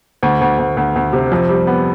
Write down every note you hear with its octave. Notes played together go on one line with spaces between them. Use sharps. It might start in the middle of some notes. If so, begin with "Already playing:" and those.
D2
D2
D2
D2
D2
C3
F2
G3
B3